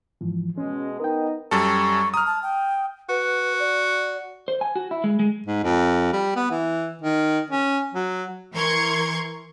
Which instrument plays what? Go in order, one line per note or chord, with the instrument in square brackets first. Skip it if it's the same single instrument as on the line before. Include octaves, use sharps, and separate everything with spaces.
[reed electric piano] G#2 E3 F3
[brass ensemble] B2 G#3 [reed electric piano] C#4
[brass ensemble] B3 D#4 D#5 [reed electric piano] A#4 G5
[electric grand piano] F#2 G3 A4 [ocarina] C#6
[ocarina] A#5 [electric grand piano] D#6 F6
[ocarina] A5
G5
[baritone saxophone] F#4 [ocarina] B4
[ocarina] D5
[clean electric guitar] C5
G#5
F#4
E4
G#3
G#3
[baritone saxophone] G#2
F2
G3
B3
E3
D#3
C#4
F#3
[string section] E3 A#4 C6 C#6 G#6